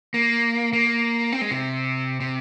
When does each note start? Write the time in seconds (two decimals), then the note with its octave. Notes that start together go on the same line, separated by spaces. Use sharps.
0.14 A#3
0.73 A#3
1.32 C4
1.41 G#3
1.51 C3
2.20 C3